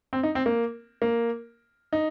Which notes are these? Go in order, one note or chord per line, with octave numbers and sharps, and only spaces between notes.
C4
D#4
C4
A#3
A#3
D#4